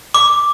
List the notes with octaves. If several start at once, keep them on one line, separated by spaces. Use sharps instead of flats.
D6